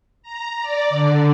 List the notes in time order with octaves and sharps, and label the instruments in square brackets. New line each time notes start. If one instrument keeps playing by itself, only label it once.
[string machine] A#5
D5
D3